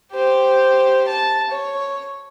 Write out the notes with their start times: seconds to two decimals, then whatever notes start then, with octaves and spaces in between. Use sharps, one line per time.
0.13 G4 C5
1.08 A5
1.51 C#5